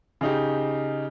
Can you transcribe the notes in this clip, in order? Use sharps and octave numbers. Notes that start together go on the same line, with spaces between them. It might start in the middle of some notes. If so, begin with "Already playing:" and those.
C#3 D#4 G4